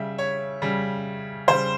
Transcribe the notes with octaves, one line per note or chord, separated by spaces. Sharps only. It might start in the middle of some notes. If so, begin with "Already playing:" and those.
Already playing: C#3 G3 E5
C#5
C#3 G3
C#3 G3 C5